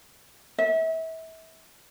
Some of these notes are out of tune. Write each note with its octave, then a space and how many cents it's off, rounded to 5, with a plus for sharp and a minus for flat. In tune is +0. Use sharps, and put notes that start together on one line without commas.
E5 -30